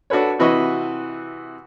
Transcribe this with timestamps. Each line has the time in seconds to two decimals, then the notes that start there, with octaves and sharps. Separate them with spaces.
0.10 D4 F#4 A4 B4 C#5
0.39 C3 E3 F#4 B4 D#5 C#6